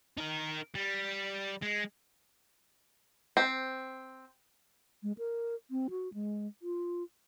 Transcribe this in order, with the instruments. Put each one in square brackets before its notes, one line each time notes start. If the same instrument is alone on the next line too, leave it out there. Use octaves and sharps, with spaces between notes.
[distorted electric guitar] D#4 A#4
G3
G#3
[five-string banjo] C4
[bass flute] G#3
A#4
C4
F#4
G#3
F4